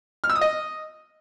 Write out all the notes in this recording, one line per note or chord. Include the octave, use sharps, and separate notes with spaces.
F6
E6
D#6
D#5